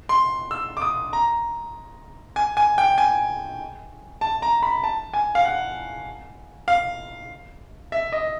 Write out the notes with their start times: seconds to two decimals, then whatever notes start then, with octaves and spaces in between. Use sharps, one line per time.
0.09 C6
0.51 E6
0.77 D6
0.82 D#6
1.13 A#5
2.36 G#5
2.57 G#5
2.78 G5
2.98 G#5
4.21 A5
4.42 A#5
4.63 B5
4.84 A5
5.14 G#5
5.35 F5
5.45 F#5
6.68 F5
7.92 E5
8.12 D#5